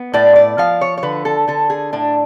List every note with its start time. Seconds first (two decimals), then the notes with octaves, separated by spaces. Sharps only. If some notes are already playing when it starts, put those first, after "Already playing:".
Already playing: B3
0.14 A2 D5
0.36 D5
0.58 F3 F5
0.81 C#5
0.98 C#5
1.03 D3 B4
1.25 A4
1.48 D3 A4
1.70 G#4
1.93 A2 D4